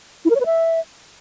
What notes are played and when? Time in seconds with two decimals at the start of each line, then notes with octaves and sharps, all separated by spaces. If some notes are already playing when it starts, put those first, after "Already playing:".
0.25 E4
0.30 A#4
0.35 C#5
0.41 B4
0.46 E5